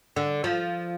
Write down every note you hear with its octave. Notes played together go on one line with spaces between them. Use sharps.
D3
F3